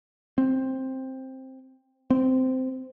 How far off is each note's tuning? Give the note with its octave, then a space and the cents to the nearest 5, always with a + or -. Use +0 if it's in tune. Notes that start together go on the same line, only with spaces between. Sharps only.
C4 +10
C4 -15